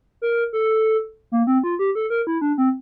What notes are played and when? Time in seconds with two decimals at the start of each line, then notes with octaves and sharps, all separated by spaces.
0.22 A#4
0.53 A4
1.32 A#3
1.47 C4
1.63 F4
1.79 G4
1.95 A4
2.10 A#4
2.27 E4
2.41 D4
2.58 C4